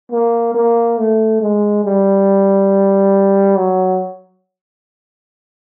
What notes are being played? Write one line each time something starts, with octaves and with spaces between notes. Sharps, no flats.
A#3
A#3
A3
G#3
G3
F#3